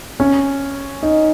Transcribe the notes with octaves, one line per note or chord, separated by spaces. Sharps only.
C#4
D#4